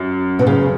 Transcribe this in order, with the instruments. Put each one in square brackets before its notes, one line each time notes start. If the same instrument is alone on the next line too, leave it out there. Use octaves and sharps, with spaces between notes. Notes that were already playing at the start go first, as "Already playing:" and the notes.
Already playing: [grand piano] F#2
[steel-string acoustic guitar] B2
C#3